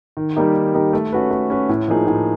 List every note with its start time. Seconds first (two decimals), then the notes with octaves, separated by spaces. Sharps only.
0.17 D#3
0.36 G3 A#3 D#4 G4
0.55 D#3
0.74 G3 A#3 D#4 G4
0.93 A3
1.13 C#4 F#4 B4
1.31 A3
1.50 C#4 F#4 B4
1.69 A2
1.88 F3 A#3 D#4 G#4
2.07 A2